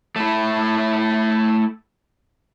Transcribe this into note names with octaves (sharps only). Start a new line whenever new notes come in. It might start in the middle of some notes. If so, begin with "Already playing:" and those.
A3 E4